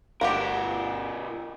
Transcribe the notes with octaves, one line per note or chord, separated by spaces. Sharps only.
G1 B2 D4 F#4 G4 A#4 F5